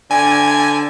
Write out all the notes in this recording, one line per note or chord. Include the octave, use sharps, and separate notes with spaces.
D3 G#5